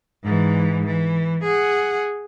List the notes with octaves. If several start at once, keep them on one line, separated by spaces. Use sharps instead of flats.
G#2 E3
E3
G#4 F#5